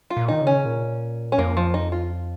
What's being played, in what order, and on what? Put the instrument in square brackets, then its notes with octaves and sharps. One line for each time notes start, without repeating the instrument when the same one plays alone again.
[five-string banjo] F4
[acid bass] A#2
[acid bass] D#3 [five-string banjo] D#4
[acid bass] C#3
[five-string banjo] C#4
[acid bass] A#2
[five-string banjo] C#4
[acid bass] F2 [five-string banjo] A#3
[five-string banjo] F3
D#4
F4